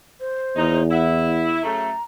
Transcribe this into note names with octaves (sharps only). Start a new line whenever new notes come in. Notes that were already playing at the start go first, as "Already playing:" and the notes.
C5
E2 A#2 C#3 D#4
E4 F#5
F#2 C#3 A3 A#5